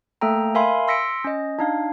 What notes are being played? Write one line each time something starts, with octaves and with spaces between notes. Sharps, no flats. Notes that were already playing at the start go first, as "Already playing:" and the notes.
A3 A#3 A4 G5 A#5
A#4 E5 F5 G#5 B5 C6
C6 E6 A#6 B6 C#7 D7
C#4 D#5
D4 D#4 F5